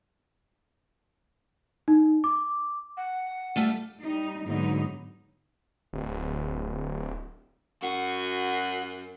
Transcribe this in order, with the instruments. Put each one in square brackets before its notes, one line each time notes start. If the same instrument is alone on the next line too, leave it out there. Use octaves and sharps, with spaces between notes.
[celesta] D#4
D6
[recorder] F#5
[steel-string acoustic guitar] G3 A3 F4
[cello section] G3 D#4
G#2 D3 F#3 B3 D#4
[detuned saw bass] D1
[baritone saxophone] F#2 [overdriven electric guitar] F#4